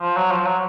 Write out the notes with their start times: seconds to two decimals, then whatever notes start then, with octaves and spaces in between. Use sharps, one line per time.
0.01 F3
0.17 F#3
0.31 F3
0.46 F#3